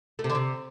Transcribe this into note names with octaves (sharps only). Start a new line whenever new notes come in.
A3
C3
D3
C3